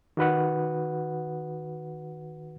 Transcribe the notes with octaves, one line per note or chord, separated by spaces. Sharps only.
D#3 F#4 B4 F#5